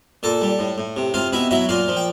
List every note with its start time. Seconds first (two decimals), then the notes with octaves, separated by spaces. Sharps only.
0.23 A#2 A4 A5
0.41 G3
0.59 A2
0.78 A2
0.97 C3
1.14 C3 F4 F5
1.33 B2 E4 E5
1.51 F#3 E4 E5
1.69 A#2 F4 F5
1.88 F3
1.97 G5